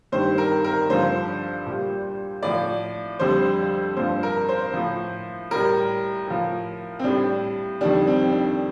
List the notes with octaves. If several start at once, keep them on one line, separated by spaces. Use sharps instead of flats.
G2 D#3 G3 C5
A#4
A#4
G2 D3 F3 C5
A#2 G3
A2 F3 D5
F2 D3 G3 C5
G2 F3 C5
A#4
C5
A2 F3
A2 G3 A#4
A2 F3
C4
A2 G3 D4
F2 D#3 G3 D4
C4
D4